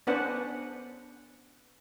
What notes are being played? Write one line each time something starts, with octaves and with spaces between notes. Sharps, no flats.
B3 C#4 D4 B4 C5 F#5